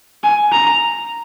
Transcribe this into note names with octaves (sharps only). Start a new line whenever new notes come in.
G#5
A#5